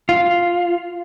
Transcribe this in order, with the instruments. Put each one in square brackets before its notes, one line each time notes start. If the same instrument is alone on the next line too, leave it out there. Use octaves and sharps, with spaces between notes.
[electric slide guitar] F4